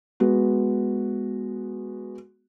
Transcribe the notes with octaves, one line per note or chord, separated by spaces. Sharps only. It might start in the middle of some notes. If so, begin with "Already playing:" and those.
G#3 B3 F#4